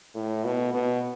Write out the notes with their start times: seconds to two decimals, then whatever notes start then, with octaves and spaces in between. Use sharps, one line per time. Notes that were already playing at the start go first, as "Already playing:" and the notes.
0.15 A2
0.44 B2
0.74 B2